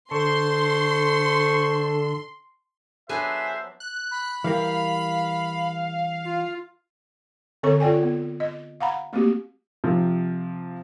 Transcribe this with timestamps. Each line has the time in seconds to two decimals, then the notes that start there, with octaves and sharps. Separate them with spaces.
0.11 D3 A4 C5 C6 C#6
3.09 F#3 B3 D4 G#4 B4 C5 E5 G#5
3.80 F#6
4.11 B5
4.44 E3 G3 A#4 F5
6.25 F4
7.63 D3 C4 A4 C#5 C#6
7.80 F4 A4 D5 G5 G#5
8.03 B3
8.40 D#5
8.81 F5 F#5 A#5 B5
9.13 A3 A#3 C4 F#4 G4
9.84 C3 F3